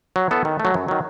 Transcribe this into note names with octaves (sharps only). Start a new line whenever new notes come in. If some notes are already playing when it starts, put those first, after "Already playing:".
F#3
B3 E4 A4
D#3
A3
F#3
F#2
D#3 F#3